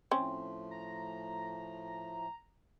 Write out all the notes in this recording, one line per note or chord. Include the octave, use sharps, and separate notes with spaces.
A2 F3 A3 C4 C#4 C6
A#5